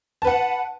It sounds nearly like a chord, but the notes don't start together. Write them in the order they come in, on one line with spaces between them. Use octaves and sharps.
A5 B4 F#5